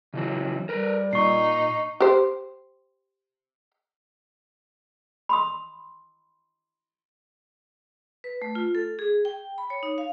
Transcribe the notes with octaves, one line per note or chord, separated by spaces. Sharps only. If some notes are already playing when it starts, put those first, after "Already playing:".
C#3 E3 F#3
G3 A#4 B4
A#2 D#4 C#6 C7
G4 C5
B5 C6 D#6
B4
A3
F4
A4
G#4
G5
B5
C#5
D#4
F5